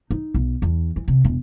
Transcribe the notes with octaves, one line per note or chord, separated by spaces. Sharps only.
D#4
B1
E2
E3
C3
E1